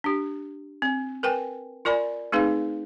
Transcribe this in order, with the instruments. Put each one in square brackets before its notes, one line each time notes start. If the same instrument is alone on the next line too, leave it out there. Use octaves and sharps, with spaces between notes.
[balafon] D4 G4
C4
A#4 B4 G5 G#5
F4 A#4 D5 G#5 B5
A3 C4 D#4 G#4 B4 F5